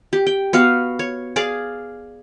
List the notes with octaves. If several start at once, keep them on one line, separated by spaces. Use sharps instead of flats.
G4
G5
B3 F#4 F5
C#5
G#4 D5 F5